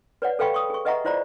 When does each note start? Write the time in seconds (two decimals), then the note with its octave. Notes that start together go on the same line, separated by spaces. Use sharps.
0.22 B4 C#5 D5 F#5
0.39 A4 B4 F5 G5 B5 C#6
0.54 C#6 D#6
0.70 G#4 C#6
0.85 B4 D#5 E5 F#5 A#5 C#6
1.05 E4 F4 C5 D5 A#5 B5